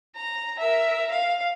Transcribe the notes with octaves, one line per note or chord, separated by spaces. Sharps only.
A#5
A#4 E5
F5